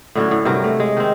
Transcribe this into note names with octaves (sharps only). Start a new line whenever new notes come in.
A2 D3 F#3 C#4
A2
G2 C3 F#3 A#4
A3
G#3
D#3 C4